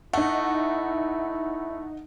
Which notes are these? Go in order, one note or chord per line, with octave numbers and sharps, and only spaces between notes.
A3 D#4 E4 F#5